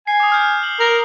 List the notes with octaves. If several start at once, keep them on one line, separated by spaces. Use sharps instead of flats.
G#5 C7
D6 D#6
F6 G6
F#7
A#4